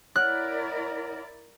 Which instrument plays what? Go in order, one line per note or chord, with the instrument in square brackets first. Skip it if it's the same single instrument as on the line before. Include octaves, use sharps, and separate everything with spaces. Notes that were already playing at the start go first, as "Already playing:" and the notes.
[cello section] E4 A#4 D5 [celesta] C#5 F#5 F6 [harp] F#6